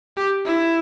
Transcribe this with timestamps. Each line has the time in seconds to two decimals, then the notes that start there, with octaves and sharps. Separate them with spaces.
0.17 G4
0.46 E4